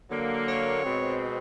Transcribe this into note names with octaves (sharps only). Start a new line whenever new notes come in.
D3 F#3 A#3
C#5
B2 G#3 C4